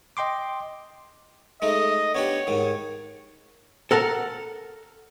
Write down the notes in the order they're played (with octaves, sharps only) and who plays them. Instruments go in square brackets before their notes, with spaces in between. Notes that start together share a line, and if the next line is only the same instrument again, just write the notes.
[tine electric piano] D#5 G5 C6 D6
[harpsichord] G#3 A3 D#4 [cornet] D#5
[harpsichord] B3 D4 G4 [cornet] C#5
[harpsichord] G#2 D#3
[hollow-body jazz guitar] A4 A#4 F#5 A5